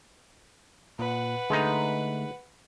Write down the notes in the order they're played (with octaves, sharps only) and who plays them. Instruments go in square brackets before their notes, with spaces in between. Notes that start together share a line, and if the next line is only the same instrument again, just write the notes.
[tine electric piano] A#2 [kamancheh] B4 F#5
[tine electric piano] D3 A3 [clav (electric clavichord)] G#3 D#4